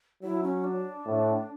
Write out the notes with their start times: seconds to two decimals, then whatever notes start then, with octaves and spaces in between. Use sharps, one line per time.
0.23 F#3 E4
0.43 C#4
0.64 D4
1.06 A2